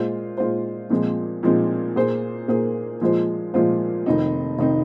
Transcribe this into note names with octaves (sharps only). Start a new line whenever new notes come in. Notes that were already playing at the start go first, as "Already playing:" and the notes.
Already playing: A#2 G#3 F4 C5
A#2 G#3 F4 C5
A#2 F3 G#3 C4
A#2 F3 G#3 C4
A#2 A#3 G#4 C5
A#2 A#3 G#4 C5
A#2 F3 G#3 F4 C5
A#2 F3 G#3 F4 C5
F1 F2 D#3 C4 D#4
F1 D#3 C4 D#4